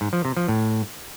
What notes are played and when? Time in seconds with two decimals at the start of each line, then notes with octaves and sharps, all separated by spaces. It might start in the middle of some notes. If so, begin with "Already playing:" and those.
0.01 G#2
0.13 F3
0.25 C3
0.37 F3
0.48 A2